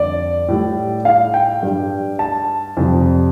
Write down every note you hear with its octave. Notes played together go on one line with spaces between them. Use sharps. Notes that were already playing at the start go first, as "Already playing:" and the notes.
Already playing: F2 D3 G3 D5
A2 G3
F5
G5
G2 G3
A5
F2 C3 G3